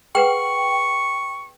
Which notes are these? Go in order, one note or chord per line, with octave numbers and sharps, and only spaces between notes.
G#4 B4 F#5 G5 C#6